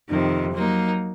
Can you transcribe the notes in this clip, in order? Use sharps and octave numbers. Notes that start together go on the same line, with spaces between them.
F2 C3 D#3
F#3 A#3 D#4